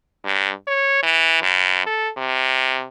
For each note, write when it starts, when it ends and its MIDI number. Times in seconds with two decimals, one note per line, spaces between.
0.25 0.51 43
0.67 0.99 73
1.03 1.39 52
1.42 1.82 42
1.86 2.10 69
2.17 2.86 48